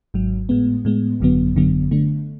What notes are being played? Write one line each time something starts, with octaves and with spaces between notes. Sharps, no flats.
G#1 G#2 F#3
A2 G#3 B3
A2 G#3 B3
G#1 F#2 D3 F#3 B3
G#1 F#2 D3 F#3 B3
D3 A3 D4